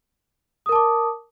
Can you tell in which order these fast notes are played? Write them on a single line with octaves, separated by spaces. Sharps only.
D#6 A#4 A5 D6